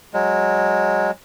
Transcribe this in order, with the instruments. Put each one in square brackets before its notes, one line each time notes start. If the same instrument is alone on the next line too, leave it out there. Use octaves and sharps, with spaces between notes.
[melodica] F#3 G#3